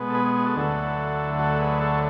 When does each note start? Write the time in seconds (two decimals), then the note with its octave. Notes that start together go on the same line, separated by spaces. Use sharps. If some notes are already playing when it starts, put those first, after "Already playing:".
Already playing: B2 G#3 B3
0.10 A4
0.14 G#4 B4
0.25 G#4
0.36 G#4
0.46 F#4 A4
0.56 D2 D3 F#3 A3 E4
1.39 F#4 A4
1.60 G#4 B4
1.81 A4 C#5